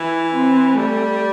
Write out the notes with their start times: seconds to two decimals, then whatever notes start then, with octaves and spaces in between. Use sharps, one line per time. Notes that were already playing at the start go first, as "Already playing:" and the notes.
Already playing: E3 E4
0.34 C4
0.76 G3 A3